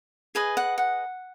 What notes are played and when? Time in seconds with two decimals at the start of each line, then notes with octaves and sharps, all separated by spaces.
0.35 G#4 B4 D#5 G#5
0.57 F#5
0.78 F#5